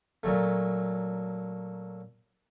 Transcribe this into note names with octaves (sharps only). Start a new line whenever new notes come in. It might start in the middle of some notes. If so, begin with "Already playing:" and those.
A#2 F#3 A3